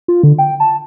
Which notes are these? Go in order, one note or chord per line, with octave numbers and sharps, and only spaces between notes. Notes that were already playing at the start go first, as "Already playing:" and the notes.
F4
D3
G5
A5